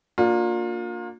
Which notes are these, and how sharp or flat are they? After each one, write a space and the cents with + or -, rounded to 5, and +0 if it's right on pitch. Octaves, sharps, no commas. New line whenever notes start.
A#3 -10 D4 +0 F4 +30